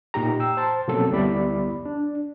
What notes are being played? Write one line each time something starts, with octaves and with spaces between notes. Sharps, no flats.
A#2 D#4 G4 A#5
G5 E6
C5 A5
B2 F#3 A#3 C4 C#4 A4
D2 G3 B3 E4 D5 B5
D4